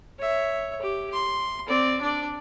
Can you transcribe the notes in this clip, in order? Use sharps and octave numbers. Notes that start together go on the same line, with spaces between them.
C#5 E5
G4
C6
C4 D5
D4 D5